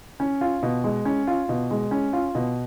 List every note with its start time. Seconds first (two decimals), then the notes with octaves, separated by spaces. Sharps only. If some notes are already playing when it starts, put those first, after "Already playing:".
0.20 C#4
0.41 F4
0.63 B2
0.84 G#3
1.05 C#4
1.27 F4
1.49 B2
1.71 G#3
1.91 C#4
2.13 F4
2.35 B2